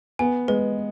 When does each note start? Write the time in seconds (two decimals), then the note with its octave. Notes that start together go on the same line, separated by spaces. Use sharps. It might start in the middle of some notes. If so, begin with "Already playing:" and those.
0.19 B3 G#5
0.48 G#3 B4